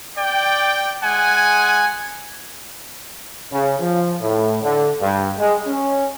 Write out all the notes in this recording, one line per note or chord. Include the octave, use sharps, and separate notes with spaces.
D5 G5
G#3 F#5 G#5
C#3
F3
A2
D3
G2
G#3
C#4